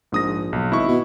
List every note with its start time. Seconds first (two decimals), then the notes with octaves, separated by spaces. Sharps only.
0.12 A#1 G#2 D#6 A#6
0.53 B1
0.72 G#1 E4 D#5 C#6
0.88 B2